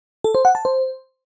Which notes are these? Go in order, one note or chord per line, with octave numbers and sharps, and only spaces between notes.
A4
C5
F#5
A5
C5